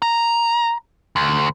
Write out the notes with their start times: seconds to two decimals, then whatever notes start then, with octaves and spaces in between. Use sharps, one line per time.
0.02 A#5
1.16 D2